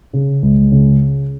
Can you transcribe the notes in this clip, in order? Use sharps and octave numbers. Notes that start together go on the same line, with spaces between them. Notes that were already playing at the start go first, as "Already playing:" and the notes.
C#3
C#2
C#3